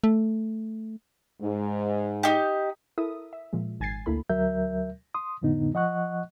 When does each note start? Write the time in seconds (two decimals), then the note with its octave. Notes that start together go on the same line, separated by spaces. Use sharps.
0.04 A3
1.41 G#2
2.23 D#4 G4
2.98 E4 A4 A#4 E5 D#6
3.33 E5
3.53 A#2 F3 G#3
3.80 G#1 G#5 G#6 A6 C7
4.06 D2 A#3 E4 A4 B5
4.29 D2 F#3 A#4 E5 G6
5.14 C6 D#6
5.42 F2 A2 D3 B3 D#4
5.74 F3 D#5 F#5 C#6 F#6